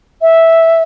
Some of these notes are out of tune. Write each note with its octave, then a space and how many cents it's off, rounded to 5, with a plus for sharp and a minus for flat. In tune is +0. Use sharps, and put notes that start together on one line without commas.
E5 -5